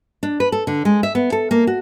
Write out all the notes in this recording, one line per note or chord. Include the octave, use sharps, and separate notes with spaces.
D4
B4
A4
D3
G#3
E5
B3
A4
A#3
F#4